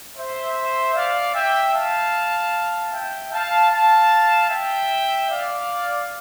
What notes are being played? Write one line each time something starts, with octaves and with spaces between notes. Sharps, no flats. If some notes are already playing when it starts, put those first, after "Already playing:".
C5 E5
D5 F5
E5 G5
F5 A5
E5 G5
F5 A5
F5 A5
E5 G5
D5 F5